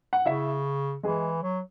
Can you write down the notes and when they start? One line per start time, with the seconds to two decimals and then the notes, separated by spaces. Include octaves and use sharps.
0.13 F#5
0.26 C#3 E4 E5
1.03 E3 G#3 G#4
1.43 F#3